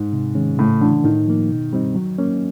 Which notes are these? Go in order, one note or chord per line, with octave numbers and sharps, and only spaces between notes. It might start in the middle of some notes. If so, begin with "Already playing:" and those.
Already playing: G#2
C3
D#3 G#3 C#4
A2 C#3
D3 E3 A3
A2 D#3
F3 A#3
B2
G3 C4 D#4
F#3
A#3 C#4